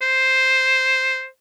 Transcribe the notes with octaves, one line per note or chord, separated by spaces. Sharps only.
C5